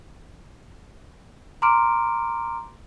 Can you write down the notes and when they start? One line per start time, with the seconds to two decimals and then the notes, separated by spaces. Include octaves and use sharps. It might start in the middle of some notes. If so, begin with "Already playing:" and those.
1.62 A#5 C6 D6 F6 D7